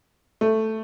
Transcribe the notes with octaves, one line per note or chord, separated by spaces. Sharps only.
A3